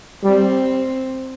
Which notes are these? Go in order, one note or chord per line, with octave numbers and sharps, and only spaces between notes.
G3 C4